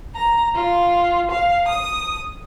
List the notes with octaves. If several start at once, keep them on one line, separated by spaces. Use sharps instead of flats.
A#5
F4
F5
D#6